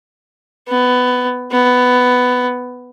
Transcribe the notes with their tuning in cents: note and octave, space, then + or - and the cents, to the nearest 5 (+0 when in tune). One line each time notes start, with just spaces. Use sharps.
B3 +15
B3 +10